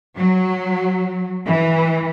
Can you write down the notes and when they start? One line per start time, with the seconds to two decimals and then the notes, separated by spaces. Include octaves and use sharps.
0.17 F#3
1.46 E3